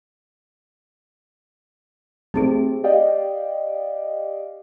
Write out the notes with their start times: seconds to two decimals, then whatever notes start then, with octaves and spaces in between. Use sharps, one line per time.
2.34 A3 C4 D#4 G4 G#4
2.84 G4 D5 D#5 F5 G5